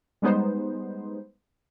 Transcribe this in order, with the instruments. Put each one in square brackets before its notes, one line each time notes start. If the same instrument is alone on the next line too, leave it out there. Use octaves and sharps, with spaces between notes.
[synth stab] G3 G#3 B3 D#4 C5